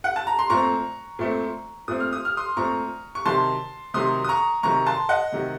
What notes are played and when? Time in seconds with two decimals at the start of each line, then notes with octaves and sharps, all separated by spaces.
0.04 F#5
0.16 A5
0.27 A#5
0.39 C6
0.50 A#2 A3 C4 A#5 C#6
1.19 A#2 A3 C4
1.88 A#2 A3 C4 D#6
2.00 F6
2.13 D#6
2.25 F6
2.37 C6 D#6
2.57 A#2 A3 C4 A#5 C#6
3.15 C#6
3.25 C3 D#3 F#3 A5 C6
3.94 C3 D#3 F#3 C6 D#6
4.24 D#6
4.29 A#5 C#6
4.63 C3 D#3 F#3 A#5 C#6
4.86 A5 C6
5.09 D#5 F#5
5.32 C3 D#3 F#3